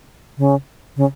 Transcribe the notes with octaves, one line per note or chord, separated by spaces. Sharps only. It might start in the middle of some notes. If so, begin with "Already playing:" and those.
C#3
C#3